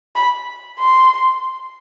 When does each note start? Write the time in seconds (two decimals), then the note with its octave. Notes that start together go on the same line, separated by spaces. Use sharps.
0.15 B5
0.79 C6